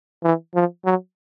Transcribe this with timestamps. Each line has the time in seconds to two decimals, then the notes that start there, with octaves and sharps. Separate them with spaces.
0.23 E3
0.55 F3
0.85 F#3